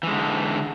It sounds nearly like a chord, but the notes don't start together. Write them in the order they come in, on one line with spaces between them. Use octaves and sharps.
E3 G#3 D3